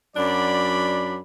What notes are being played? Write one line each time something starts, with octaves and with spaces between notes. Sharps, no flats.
F#2 F#3 D4 D5 B5